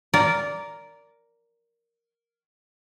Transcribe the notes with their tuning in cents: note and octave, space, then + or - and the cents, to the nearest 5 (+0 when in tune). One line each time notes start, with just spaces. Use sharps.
A#4 +0 D5 -15